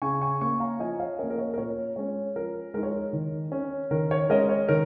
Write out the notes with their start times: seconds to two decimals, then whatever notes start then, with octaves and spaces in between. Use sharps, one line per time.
0.02 C#3 G#5 C#6
0.21 G#5 C#6
0.41 A#3 C#4 G#5 C#6
0.60 F5 A#5
0.79 F3 D#5 G#5
1.00 C#5 F5
1.19 A#3 C#4 A#4 D#5
1.30 A#4
1.38 C#5
1.54 A#4
1.58 A#2 C#5
1.96 G#3 C#4 C#5
2.36 F3 A#4
2.74 G#3 D#4 A#4
2.83 C#5
2.91 A#4
3.13 D#3
3.52 C#4
3.91 D#3 A#4
4.11 C#5
4.30 G#3 C#4 A#4 D#5
4.49 C#5
4.69 D#3 A#4